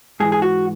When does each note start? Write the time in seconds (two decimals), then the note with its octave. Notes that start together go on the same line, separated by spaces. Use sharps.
0.20 G#2 G#4
0.23 E3
0.32 G#4
0.42 F#4